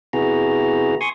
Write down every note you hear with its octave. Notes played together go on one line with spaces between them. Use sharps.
C3 B3 E4 F#4 G#4 A#5
G#5 C6 C#6 D#6